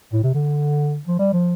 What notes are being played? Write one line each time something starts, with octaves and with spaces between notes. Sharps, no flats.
A2
C3
D3
F3
G3
F3